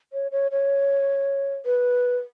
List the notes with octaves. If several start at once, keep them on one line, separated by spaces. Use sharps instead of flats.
C#5
C#5
C#5
B4